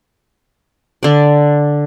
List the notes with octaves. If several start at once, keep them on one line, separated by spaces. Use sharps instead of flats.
D3 D5